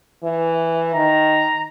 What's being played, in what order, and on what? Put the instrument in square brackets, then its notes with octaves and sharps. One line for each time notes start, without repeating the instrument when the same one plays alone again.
[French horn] E3
[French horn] D#3 [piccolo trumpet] A#5